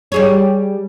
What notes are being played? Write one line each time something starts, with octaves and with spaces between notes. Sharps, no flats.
G3 G#4 C#5